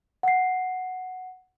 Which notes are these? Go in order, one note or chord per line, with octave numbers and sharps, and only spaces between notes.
F#5 C7